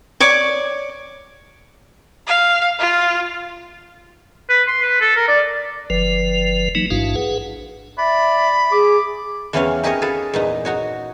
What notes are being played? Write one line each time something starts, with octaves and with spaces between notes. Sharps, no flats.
C#5 D5 D6
F5
F4
B4
C6
B4
A4
A#4
D5
G1 F3 B4
E3 F#3 A#3 D#4
A1 G#2 D4 E4 F#4 F5
G#4 B4 F#5
D5 E5 B5
G#4 D6
E2 E3 C4 C#4 C#5 F5
D#4 G4 G#4 A#4 C#5 D#5
G#4 A4 B4 F5
E2 A#2 D#4
D#4 F#4 C#5